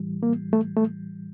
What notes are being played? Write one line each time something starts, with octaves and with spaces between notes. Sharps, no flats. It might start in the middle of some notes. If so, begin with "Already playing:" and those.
Already playing: A2 E3 G3
A#3
A3
A3